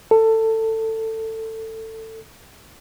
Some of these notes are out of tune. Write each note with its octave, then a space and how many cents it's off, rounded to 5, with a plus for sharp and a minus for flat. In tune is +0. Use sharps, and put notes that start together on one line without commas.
A4 +20